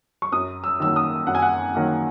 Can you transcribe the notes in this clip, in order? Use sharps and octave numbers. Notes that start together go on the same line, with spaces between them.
C#6
F#2 D#6
E6
D#3 F#3 A#3 E6
D#6
F#2 F#5
G#5
F#5
D#3 F#3 A#3